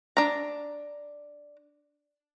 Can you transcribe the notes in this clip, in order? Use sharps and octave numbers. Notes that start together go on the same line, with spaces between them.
D4 A#5